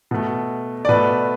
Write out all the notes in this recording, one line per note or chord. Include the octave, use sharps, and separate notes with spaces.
B2 A3
D5
B2 A3 B4